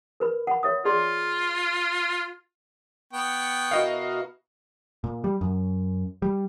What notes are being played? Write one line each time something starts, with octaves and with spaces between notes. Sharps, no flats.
A#4 B4 B5
F#5 B5
C#5 E5 D#6
F4 G#4 D5 C6
B3 G5 C#6
B2 E4 F#4 A#4 D#5 F5
A#2
G3
F#2
G3